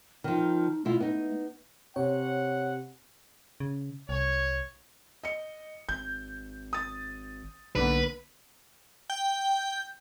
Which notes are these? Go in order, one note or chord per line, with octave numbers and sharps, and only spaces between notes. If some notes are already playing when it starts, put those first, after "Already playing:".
D#3 F3 D#4
B2 A3 E4 F4
B3 D#4
C3 C#5 F#5
C#3
C2 C#5
D#5 C#7
G#1 G6
D#6 A6
B1 D3 A#3 B3 B4
G5